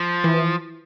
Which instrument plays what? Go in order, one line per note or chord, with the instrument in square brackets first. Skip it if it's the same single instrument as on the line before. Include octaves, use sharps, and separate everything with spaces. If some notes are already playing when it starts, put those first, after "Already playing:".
Already playing: [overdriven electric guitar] F3
[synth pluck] E3